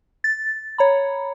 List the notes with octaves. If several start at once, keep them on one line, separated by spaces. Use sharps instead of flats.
A6
C#5 A#5 B5